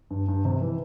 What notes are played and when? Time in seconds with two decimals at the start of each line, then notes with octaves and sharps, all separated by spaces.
0.10 G2
0.28 G2
0.45 C3
0.62 E3